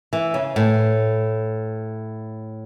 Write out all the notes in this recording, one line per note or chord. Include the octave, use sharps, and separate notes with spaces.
E3
C#3
A2